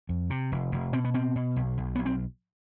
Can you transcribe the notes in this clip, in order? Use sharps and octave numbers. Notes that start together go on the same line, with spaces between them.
F2
C3
F1
F1
B2 C4
B3
B2 C4
B2
B1
B1
B1 B3
C4